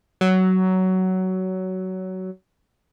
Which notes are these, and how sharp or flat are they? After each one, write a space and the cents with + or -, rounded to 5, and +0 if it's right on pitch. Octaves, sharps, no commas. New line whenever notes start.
F#3 +15